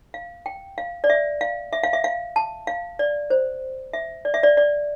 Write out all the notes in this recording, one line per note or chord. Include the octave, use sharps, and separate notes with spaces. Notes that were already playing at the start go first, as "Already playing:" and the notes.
F5
G5
F5
D5
E5
F5
E5
F5
E5
F5
A5
F5
D5
C5
E5
D5
E5
D5
D5